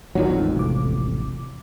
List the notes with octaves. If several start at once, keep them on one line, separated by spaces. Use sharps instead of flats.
D#2 A#2 F#3 G3 D#4 F#4
E1 A1 F2
C3 D6